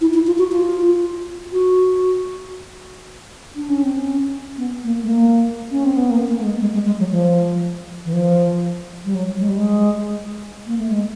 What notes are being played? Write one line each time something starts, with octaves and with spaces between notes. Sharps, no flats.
E4
E4
F4
F#4
F4
F#4
D4
C#4
C4
C#4
B3
A#3
A3
A#3
C#4
C4
B3
A#3
A#3
A3
G#3
G#3
G#3
G#3
F#3
F3
E3
F3
G3
F#3
G#3
G3
G#3
A#3
A3
G#3